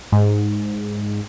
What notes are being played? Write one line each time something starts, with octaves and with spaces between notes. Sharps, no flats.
G#2